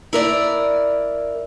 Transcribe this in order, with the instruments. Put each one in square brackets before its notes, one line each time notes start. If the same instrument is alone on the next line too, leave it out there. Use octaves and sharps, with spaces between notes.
[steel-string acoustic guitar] E4 A#4 D5